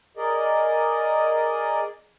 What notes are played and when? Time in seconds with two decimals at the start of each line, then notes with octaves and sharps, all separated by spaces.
0.17 G#4 A#4 D5 D#5